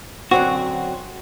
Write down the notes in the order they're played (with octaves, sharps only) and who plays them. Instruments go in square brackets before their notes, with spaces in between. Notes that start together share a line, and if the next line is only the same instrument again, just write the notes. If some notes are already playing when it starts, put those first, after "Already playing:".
[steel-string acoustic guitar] F#2 D3 F#3 C4 [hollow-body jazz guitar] F#4